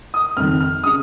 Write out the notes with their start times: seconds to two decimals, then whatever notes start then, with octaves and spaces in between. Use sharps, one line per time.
0.14 D#6
0.37 F2 D#3 F6
0.60 F6
0.84 C#3 D#6